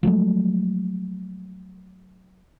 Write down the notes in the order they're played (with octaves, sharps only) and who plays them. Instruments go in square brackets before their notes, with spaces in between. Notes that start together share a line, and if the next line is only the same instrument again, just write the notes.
[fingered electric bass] F3 F#3 G#3 A3